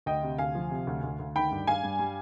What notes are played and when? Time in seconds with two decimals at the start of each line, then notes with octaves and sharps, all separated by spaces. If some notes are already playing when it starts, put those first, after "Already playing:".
0.06 D2 D#5 G5
0.23 C3
0.38 D2 F5 G#5
0.55 F3
0.71 C3
0.87 D2
1.03 D2
1.19 D2
1.35 D#3 G5 B5
1.51 G2
1.67 G2 F5 G#5
1.83 G2
1.99 G3